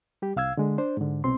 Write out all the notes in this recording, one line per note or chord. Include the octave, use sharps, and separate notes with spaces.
G3 G4
C2 F5 E6 G#6
D3 G#3
D4 C5
G#2 D3
C2 B2 C4 C6